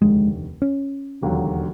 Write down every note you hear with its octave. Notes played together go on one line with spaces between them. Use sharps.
F1 D#2 D3 G#3
C#4
E1 D#2 D3 F#3